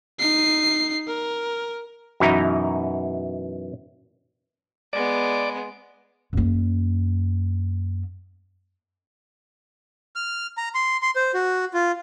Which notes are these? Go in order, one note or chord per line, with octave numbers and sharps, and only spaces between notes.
D#4 C7
A#4
F#2 B2 E3 D#4 E4 A#5
G#3 B3 D5
F#2 A#3
F6
A#5
C6
C6
C5
F#4
F4